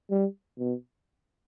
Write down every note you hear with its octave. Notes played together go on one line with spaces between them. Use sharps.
G3
B2